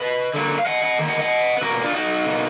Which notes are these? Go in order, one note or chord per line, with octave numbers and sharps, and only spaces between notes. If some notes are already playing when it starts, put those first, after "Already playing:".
Already playing: B4 D#5
D3 F#3 A#3
F5
D#5 F#5
D#5 F#5
D#3 A#3
D#5 F#5
D#5 F#5
B4
B2 A#3 F#4 A#4
D4 F4
D#4 F#4
B2 A#3